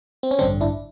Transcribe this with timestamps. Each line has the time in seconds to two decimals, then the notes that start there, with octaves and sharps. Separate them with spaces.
0.23 C4
0.31 C#4
0.39 A1 G2 D3 C4 D4
0.61 D4 E4